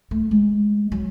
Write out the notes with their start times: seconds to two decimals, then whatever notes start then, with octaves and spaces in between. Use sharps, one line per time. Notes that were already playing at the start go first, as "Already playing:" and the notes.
0.11 A3
0.31 G#3
0.92 F#3